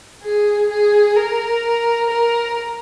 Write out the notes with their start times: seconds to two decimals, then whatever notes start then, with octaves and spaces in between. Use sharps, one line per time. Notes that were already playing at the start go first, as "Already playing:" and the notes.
0.23 G#4
0.70 G#4
1.16 A#4
2.10 A#4